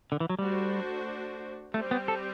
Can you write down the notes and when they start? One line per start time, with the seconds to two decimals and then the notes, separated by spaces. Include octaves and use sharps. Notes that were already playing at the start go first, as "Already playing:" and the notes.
0.12 D3
0.20 E3
0.30 F#3
0.38 G3 A3 D4 F#4 C5
1.74 G3 A3 C4 G4
1.91 B3
2.08 A4